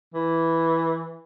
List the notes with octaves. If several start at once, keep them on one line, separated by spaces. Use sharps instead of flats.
E3